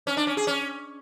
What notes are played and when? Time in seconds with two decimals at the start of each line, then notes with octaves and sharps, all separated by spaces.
0.07 C#4
0.17 D4
0.27 C#4
0.37 G#4
0.47 C#4